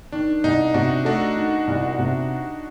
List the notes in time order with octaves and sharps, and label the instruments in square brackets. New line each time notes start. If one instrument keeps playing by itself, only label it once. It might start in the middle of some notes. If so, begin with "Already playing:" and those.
[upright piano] D#3 [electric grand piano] D4
[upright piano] C2 [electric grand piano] D#4
[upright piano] C3 [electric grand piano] D4 F#4
[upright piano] A3 [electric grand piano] D4 F#4
[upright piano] D#3
C2
C3